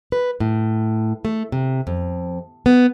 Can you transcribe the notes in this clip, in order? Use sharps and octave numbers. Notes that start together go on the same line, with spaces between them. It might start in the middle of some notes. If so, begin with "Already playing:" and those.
B4
A2
A3
C3
F2
B3